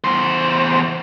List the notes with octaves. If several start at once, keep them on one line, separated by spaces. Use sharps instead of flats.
E2 C5